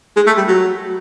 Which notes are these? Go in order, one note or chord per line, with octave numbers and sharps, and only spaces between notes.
G#3
A3
G3
F#3